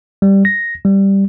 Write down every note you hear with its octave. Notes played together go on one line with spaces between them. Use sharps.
G3
A#6
G3